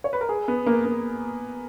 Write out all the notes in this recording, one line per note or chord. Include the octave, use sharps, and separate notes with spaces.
C#5
B4
A#4
G#4
B3
A#3
A#3